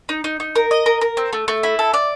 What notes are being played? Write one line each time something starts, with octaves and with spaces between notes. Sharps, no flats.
D#4
D#4
D#4
A#4
D#5
A#4
A#4
C4
A3
A3
E4
A4
D5